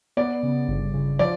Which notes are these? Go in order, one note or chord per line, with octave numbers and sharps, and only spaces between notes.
B3 D5
C#3
G1
C#3
F3 D5